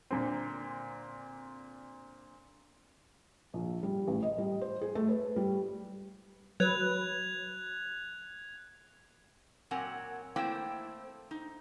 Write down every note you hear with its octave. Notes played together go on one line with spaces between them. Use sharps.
A#2 D3 C4
A#1
G3
A1
D#5
G3
C5
G#4
A3
B4
G3
F#3 B4 F#6 G#6 F7
A#2 F#3 C4 A#4 F#5 G#5
A3 A#3 C4 E4 C5 G5
D#4